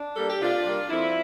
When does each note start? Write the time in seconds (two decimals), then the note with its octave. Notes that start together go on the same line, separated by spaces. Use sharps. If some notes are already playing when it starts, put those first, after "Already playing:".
Already playing: D4
0.15 G3 A#3 A4
0.28 G4
0.41 C3 D4 F4
0.66 G3 A#3
0.90 F2 C4 E4